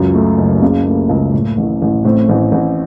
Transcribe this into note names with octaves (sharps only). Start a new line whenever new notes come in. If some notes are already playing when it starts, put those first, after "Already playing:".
Already playing: C#2 F#2 F4
A3
F#1
C#3 A#3
A3
C#2
A2
A1
A1
A2 C4
A1
A1